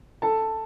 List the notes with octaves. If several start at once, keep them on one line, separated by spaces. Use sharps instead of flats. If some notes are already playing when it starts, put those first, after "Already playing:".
A4 A5